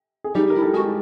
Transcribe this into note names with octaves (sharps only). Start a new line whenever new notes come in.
G#4
G3 D#4 G4
E4 A#4
A4
G#3 F#4 G#4